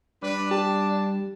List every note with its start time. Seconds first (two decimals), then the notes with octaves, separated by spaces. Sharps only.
0.22 G3 D4 B4
0.51 G4 A5